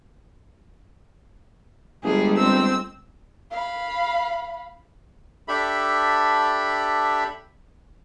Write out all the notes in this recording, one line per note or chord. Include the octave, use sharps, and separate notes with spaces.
G1 G3 G#3 G#4
C4 E6
F5 B5
D4 G4 A4 E5 B5